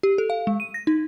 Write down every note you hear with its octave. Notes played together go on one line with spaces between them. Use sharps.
G4
A4
F5
G#3
D#7
A#6
D#4